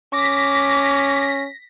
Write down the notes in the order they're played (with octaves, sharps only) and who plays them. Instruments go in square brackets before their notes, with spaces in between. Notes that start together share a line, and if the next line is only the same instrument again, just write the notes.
[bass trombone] C#4 [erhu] D6 [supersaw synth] A#6 B6